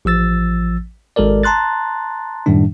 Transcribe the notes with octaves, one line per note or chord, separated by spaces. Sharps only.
A1 F3 E6 A6
G#1 G#3 A4 A#4 D5
A5 A#5 C6 F#6 A6
F#2 A2 D#3 G3 D4